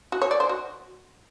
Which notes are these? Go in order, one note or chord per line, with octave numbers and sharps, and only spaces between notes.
F#4
C#5
D5
C5
F#4